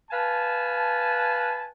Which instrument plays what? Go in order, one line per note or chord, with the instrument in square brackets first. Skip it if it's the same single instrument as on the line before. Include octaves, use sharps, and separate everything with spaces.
[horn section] B4 F5 G#5 A5